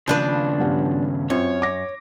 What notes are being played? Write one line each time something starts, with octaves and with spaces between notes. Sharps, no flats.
D#2 C#3 F3 D4 B4
G2 B3 C#4
F#2 C4 F4 C#5
D6 A#6